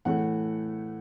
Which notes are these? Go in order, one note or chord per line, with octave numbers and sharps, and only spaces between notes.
A2 E3 A3 F#5